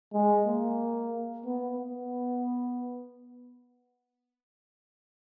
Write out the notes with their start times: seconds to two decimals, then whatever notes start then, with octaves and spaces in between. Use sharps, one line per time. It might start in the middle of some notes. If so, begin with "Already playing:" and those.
0.13 G#3
0.46 A#3
1.46 B3
1.78 B3